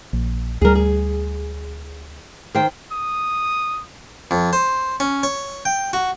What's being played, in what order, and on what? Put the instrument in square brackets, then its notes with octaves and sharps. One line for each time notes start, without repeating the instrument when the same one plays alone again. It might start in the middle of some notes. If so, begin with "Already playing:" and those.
[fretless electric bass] A#1
[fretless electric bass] D2 G3 [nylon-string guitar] G#4 A#4
[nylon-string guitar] G#4
D#3 C5 G5
[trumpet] D#6
[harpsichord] F2
C5
C#4
C#5
G5
F#4